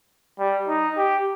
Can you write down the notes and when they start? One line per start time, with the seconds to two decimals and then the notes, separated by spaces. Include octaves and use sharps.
0.39 G3
0.68 D#4
0.97 G4